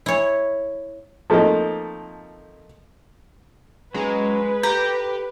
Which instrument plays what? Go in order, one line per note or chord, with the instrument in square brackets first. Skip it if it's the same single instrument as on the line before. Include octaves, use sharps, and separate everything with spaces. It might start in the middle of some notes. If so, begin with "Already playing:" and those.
[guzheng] E4 C#5
[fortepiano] F3 A3 A#3 C4 D#4
[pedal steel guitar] F#3 C#4 A#5 [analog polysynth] G#3 [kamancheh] B4
[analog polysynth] G4 [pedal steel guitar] A4 G6 [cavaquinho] A#5